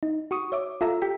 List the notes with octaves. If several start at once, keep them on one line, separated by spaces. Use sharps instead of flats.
D#4
F#4 C#6 D#6
C#5 E5 D6
F4 A4 E5 A#5 E6
G4 G5 B6